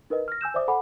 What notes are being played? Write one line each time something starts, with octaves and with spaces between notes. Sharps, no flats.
D#4 A#4 B4 D#5
F6 A#6
G#5 E6 G6 E7
C5 D5 E5 D6 D#6
A4 F#5 G#5 B5 D6